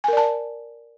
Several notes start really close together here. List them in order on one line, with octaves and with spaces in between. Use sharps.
G#5 A#4 D5 A5